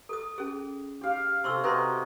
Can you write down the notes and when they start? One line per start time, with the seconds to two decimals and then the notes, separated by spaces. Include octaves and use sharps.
0.09 A4 D#6
0.38 C#4 G#4
1.01 G4 F5
1.44 C3 A4 C6 C#6 E6
1.64 C3 F#4 B4 D#5 A#5 C6